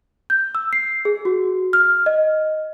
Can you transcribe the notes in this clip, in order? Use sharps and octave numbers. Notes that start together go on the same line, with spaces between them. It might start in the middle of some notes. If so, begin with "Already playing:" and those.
G6
E6
C7
G#4
F#4
F6
D#5